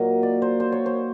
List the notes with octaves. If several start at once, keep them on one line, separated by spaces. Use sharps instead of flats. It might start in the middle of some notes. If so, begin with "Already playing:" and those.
Already playing: A#2 F#3 A#3 D#5
D5
C5
C5
C#5
C5